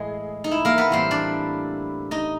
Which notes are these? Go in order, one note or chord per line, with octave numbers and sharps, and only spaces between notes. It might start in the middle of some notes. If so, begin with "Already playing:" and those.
Already playing: A2 E3 G#3 G#4
D#4
E4
A#3 A#4
B3 B4
A2 E3 G3 A#3 C4 C5
D4 D5
D#4 D#5